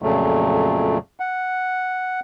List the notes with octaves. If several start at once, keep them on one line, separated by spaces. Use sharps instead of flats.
F2 A#2 C#3 F#3 A3
F#5